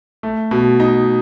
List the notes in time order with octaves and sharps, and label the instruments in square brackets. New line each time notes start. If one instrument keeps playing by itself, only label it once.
[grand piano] A3
B2
D#4